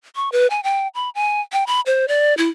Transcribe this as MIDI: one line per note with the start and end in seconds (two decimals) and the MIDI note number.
0.16 0.32 85
0.32 0.47 71
0.50 0.60 80
0.64 0.88 79
0.95 1.10 83
1.15 1.41 80
1.52 1.64 79
1.67 1.81 83
1.86 2.06 72
2.08 2.34 74
2.38 2.49 64